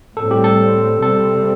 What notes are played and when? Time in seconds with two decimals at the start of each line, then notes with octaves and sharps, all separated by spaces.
0.17 A2 G3 C4 A4
0.31 G4
0.44 A4
1.02 C3 G3 C4 A4